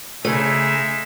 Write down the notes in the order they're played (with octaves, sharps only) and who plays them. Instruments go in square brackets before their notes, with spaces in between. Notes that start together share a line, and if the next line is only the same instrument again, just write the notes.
[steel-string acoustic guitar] C#3 A3 [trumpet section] G#3 D#4 E5